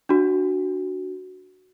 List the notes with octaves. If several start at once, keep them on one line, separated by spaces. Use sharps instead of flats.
D4 F#4